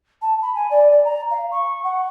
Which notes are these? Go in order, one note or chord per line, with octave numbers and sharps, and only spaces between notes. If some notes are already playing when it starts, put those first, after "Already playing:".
A5
B5
G#5
D5
D5
A#5
F5
C#6
F#5